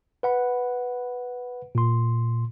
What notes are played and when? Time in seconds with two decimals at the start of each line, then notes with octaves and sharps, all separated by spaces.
0.23 B4 F#5 B5
1.75 A#2 C6